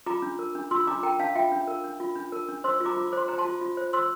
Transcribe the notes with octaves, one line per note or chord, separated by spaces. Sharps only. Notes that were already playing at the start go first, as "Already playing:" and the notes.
F4 A#5 D6
D4
A#4
D4
F4 C6 E6
D4 A#5 D6
A#4 G5 A#5
D4 F5 A5
F4 E5 G5
D4
A#4
D4
F4
D4
A#4
D4
C5 C6 E6
F4
A#5 D6
F4
D6
C5 C6
C5 A#5
A5 C6
F4
F4
C5
C5 C6 E6